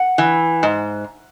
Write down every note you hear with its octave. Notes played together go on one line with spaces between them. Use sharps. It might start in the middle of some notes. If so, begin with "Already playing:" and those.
Already playing: F#5
E3
G#2